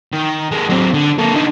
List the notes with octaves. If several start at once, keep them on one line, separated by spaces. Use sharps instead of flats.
D#3
G#3 A#3
F#3 C4
D3
A#3 A4
D3 D#4